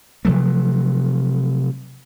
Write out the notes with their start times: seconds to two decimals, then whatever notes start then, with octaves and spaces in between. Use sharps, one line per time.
0.25 C3 F3 F#3 A3